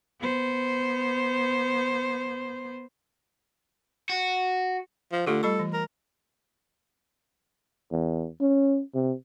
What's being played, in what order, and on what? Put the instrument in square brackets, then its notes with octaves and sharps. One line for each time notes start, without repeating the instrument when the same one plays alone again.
[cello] B3 C5
[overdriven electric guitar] F#4
[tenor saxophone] F3
[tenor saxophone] D3 [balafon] A3 F4 G4
[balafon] G3 B5 C#6 [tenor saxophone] A4
[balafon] E3
[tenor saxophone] A#4
[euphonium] E2
C#4
C3